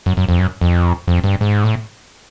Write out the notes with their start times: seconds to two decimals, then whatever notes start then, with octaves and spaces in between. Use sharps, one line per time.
0.06 F#2
0.17 F#2
0.29 F2
0.39 F#2
0.61 F2
1.08 F2
1.24 G2
1.41 G#2
1.64 A2